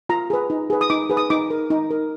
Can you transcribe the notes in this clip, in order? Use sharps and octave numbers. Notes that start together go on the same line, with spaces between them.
F4 A#5
G#4 B4
D#4
G#4 B4
D#6
D#4 D6
G#4 B4
D#6
D#4 D6
A#4
D#4
A#4